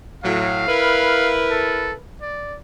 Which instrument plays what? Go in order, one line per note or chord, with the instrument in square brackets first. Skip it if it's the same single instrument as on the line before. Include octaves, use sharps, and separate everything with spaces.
[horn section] A2 F#3 [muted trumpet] F5
[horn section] E4 A#4 B4
[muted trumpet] A4
D5